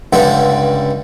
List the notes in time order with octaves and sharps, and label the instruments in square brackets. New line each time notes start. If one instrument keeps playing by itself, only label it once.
[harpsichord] C#2 G2 D3 G3 G#3 E5